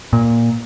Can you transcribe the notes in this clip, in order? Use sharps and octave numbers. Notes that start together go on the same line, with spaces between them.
A#2